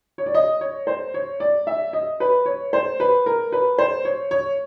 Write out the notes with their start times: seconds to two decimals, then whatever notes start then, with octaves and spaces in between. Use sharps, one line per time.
0.18 C#5
0.26 D5
0.34 D#5
0.61 C#5
0.87 C5
1.14 C#5
1.40 D5
1.67 E5
1.93 D#5
2.20 B4
2.46 C#5
2.73 C5
3.00 B4
3.26 A#4
3.52 B4
3.78 C5
4.05 C#5
4.31 C#5